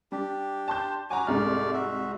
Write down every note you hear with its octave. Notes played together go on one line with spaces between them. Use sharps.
G3 D4 G4
A5 C6 G6
F#3 F#4 G#5 A#5 D6
C2 G#2 A3 D5 F6
F#4 E5